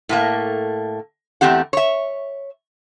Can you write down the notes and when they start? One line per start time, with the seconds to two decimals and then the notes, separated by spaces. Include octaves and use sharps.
0.09 A2 A3 A#3
1.41 E2 E3 A3 C4 G4 F#5
1.73 C#5 E5